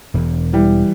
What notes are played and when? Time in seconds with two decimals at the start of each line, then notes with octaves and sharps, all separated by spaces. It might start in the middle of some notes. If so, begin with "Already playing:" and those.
0.14 E1 E2
0.53 E3 G3